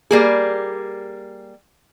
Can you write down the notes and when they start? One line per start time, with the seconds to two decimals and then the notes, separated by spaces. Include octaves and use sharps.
0.11 G3 A#3 G#4